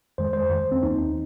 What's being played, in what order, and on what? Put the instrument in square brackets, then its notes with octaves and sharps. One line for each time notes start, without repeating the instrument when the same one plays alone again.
[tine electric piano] F2 D#3 G#3 C5
C5
F2 D#3 G#3
C4
D#2 D#3 A#3 D#4